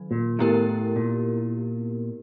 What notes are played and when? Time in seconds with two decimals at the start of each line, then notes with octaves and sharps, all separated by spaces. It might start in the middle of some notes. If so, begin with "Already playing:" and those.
Already playing: D#3 F#3
0.11 A#2
0.39 A2 B3 E4 G4 A#4
0.96 A#2